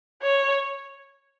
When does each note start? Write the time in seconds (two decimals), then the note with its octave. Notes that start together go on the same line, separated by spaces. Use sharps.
0.22 C#5